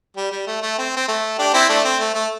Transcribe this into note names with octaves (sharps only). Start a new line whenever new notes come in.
G3
G3
A3
A3
C4
C4
A3
D4 G4
C4 E4
A3 D4
C4
A3
A3